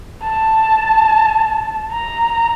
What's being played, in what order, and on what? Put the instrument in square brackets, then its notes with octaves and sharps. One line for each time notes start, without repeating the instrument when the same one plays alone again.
[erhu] A5
A#5